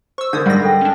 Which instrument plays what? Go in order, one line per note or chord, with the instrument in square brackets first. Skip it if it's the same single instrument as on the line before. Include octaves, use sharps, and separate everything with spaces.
[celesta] C5 [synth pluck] C#6 E6
[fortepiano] D3 [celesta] A#4 G6 [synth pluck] D#6 G#6
[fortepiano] G#2 D5 F#5 [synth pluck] G3 A#6
[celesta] A4 G5
[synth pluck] C#4 D4